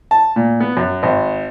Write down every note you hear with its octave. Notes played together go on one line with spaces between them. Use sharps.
A5
A#2
B3
F#2
G#1